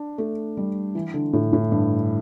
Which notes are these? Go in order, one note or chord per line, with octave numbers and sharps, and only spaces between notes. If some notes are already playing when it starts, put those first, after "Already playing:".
Already playing: D4
A3
G3
E3
D3
A2
A2
G2